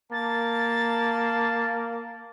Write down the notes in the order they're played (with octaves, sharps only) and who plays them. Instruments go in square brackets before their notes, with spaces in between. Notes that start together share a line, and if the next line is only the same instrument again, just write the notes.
[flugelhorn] A#3 [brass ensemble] A5 [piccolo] A6